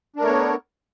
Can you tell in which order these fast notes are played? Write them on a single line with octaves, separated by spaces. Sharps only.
D4 A#4 A3 C#5 B3